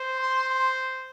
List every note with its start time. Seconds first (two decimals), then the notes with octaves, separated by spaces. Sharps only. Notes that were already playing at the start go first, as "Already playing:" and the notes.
Already playing: C5
0.18 C6